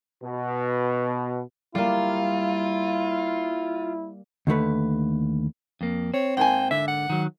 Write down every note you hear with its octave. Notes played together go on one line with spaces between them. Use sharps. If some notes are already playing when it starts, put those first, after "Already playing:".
B2
G3 A#3 E4 F4
D#2 D3 A3 B4
F2 A#3
C4 C#5
G#2 A#3 G5 G#5
D3 E5
F#5
D#3 F#3